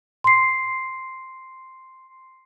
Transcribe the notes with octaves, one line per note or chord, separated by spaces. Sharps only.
C6 C7